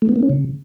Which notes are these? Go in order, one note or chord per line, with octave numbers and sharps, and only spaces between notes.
A3
B3
A#3
C#4
C#3